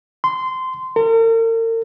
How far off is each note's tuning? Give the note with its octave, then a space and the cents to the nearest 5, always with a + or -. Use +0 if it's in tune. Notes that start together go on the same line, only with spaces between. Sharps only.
C6 -20
A#4 -40